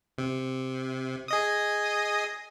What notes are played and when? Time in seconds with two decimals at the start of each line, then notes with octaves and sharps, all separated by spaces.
0.18 C3
1.28 G#4 D#5 D#6